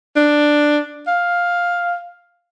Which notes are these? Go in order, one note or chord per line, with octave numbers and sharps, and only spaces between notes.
D4
F5